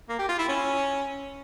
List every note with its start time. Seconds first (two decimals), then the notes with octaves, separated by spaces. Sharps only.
0.09 A#3
0.19 G4
0.29 F4
0.39 E4
0.48 C#4